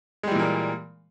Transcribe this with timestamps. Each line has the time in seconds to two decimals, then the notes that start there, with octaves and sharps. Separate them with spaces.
0.23 G#3
0.27 G3
0.31 E3
0.35 A#2
0.39 A#3